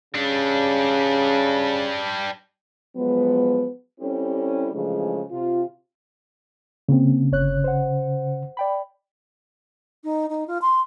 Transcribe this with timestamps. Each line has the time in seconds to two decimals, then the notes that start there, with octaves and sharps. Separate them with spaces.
0.14 C#3 G3 D4
2.96 F3 F#3 G#3 B3
4.00 G3 C4 C#4 E4 G4 A4
4.72 C#3 E3 F3 G#3 A3 D4
5.31 C3 F4
6.89 C#3 A#3 C4
7.32 G1 C#5 F#6
7.64 C5 F#5
8.57 D5 G5 B5
10.04 D#4
10.30 D#4
10.48 F4
10.62 C6